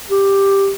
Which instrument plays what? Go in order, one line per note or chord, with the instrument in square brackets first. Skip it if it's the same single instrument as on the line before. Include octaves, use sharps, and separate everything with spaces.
[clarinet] G4